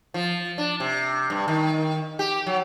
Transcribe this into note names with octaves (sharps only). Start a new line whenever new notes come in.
F3
D4
C3
G2
D#3
G4
F#3